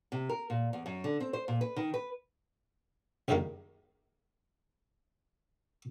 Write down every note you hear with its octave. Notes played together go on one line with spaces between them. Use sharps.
C3
A#4
A#2
E2
F#2
D3
C4
C5
A#2
B4
D#3
B4
C#2 F#2 D#3 G3 G#3 A#3